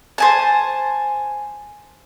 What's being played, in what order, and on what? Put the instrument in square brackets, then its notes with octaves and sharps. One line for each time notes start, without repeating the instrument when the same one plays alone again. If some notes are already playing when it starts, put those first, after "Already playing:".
[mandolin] C5 G#5 A5